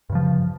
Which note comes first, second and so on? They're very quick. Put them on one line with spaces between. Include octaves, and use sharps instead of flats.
G2 C#3 F3